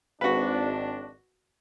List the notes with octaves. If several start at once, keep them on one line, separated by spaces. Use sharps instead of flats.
G#1 D4 F#4 B4